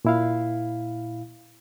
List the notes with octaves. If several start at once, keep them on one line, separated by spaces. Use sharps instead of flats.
A#2 E4 F5